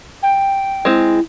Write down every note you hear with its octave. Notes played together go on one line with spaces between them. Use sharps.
G5
G#3 C4 E4